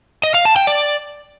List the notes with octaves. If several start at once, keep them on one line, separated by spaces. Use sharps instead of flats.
D#5
F5
A5
G5
D5